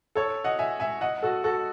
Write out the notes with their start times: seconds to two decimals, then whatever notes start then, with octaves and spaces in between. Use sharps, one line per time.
0.15 A4 C#5
0.44 D#5 F#5
0.59 E5 G#5
0.80 E5 G#5
1.01 D#5 F#5
1.23 F#4 A4
1.44 F#4 A4